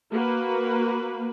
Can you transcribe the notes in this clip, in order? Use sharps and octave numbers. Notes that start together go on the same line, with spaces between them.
A#3 F#4 B4